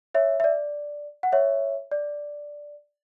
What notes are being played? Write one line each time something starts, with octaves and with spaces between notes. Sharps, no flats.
C#5 E5
E5
D5
F#5
C#5 E5
D5